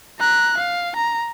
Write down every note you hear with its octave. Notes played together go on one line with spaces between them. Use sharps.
A#5 F#6
F5
A#5